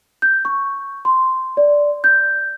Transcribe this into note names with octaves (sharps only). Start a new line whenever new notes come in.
G6
C#6
C6
D5
G6